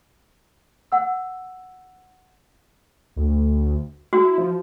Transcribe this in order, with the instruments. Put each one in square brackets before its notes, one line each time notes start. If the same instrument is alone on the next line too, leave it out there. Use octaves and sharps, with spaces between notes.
[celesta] F#5 E6
[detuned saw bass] D2
[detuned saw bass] E4 [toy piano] F#4
[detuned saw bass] F3